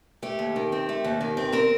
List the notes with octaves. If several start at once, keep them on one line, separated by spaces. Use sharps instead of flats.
A3 G4
D#2
D#3
C4
A3
D#2
D#3
C4
C4 A#4